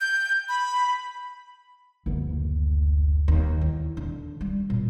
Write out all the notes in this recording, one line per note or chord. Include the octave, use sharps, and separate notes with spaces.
G6
B5
F#1 D2
D#2
E2
D3
G3
A#2